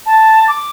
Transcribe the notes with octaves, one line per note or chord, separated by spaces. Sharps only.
A5
D6